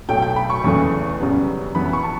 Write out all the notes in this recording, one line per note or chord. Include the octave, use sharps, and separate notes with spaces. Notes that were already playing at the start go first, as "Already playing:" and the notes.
B1 B2 F#3 A3 G5
G5
B5
C#6
E2 C#3 E3 A3 C#6
F#2 C#3 G3 B3
F#2 E3 B3 B5
B5
C#6
A5